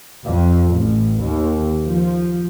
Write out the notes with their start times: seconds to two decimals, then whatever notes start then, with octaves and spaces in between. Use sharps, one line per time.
0.25 F2
0.72 A1
1.21 D#2
1.86 F3